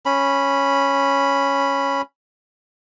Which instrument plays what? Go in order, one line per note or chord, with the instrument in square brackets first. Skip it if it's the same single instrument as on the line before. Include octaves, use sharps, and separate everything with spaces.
[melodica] C#4 B5